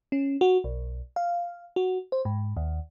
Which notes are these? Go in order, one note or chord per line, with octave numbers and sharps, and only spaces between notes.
C#4
F#4
B1
F5
F#4
C5
G#2
D#2